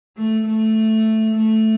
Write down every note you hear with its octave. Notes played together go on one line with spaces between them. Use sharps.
A3
A3
A3